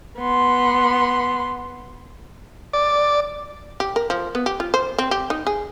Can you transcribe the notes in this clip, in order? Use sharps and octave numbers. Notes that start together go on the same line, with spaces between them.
B3 C6
D5
G4
A#4
F3
B3
G4
F4
C5
C4
G4
D#4
G#4